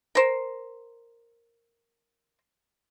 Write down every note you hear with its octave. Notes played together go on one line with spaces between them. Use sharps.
A#4 C5